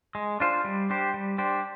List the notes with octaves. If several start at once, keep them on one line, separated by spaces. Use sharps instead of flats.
G#3
D4 F4 C5
G3
D4 G4 C5
G3
D4 G4 C5